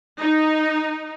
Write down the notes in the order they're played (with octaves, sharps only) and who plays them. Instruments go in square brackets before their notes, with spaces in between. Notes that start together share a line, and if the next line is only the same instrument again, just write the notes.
[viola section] D#4